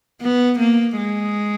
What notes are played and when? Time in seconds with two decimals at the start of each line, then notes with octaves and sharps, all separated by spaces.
0.21 B3
0.59 A#3
0.97 G#3